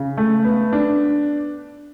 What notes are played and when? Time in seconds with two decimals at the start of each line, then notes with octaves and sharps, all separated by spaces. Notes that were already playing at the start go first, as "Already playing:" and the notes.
Already playing: C#3
0.17 A3
0.45 B3
0.73 D4